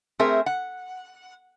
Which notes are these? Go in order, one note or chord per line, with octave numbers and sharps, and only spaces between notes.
A3 C4 G#4 A#4 E5
F#5